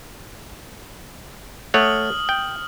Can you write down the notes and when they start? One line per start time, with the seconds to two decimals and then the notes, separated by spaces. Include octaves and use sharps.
1.74 A3 C#5 F#5 D#6 F6 F#7
2.29 G5